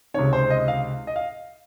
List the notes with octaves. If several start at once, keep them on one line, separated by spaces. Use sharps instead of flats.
C#2 C3 D#3 C#5
C5
D#5
F5
D#5
F5